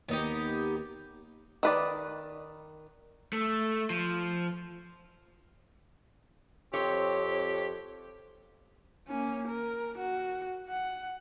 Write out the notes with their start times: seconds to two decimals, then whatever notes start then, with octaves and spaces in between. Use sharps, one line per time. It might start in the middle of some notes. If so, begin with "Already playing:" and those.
0.09 D#2 B3 D#4 G4
1.63 D#3 B4 D5
3.33 A3
3.90 F3
6.74 F2 C4 G4 C#5
9.08 A#3 C#4
9.48 A#4
9.98 F#4
10.69 F#5